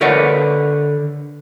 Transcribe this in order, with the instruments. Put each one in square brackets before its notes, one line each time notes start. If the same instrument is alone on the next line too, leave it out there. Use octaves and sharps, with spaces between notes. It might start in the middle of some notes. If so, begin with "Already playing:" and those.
[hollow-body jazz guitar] D3 A#4 B4 C#5 D5 F#5